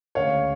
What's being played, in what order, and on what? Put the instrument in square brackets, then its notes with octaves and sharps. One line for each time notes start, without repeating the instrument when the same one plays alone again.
[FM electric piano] D2 C#3 G#3 C#4 F#4 [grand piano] C#5 F5